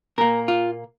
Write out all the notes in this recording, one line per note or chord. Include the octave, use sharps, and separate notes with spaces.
A#2 A#3 A#4
F4